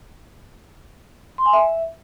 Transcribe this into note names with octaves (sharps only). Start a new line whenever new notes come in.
C6
G#5
E5